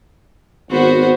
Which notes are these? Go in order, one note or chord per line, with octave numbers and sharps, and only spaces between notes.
G#1 B3 F#4 C5